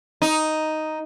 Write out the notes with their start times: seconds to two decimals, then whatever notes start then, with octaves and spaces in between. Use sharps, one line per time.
0.22 D#4